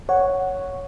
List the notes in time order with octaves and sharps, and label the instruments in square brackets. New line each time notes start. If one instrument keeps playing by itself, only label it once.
[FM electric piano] C#5 F#5